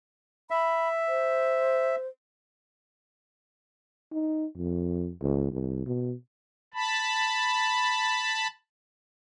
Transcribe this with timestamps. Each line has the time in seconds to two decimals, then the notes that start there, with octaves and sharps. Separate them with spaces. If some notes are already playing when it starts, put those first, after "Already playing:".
0.51 E5 B5
1.08 C5
4.12 D#4
4.58 F2
5.21 C#2
5.52 C2
5.87 B2
6.74 A5 B5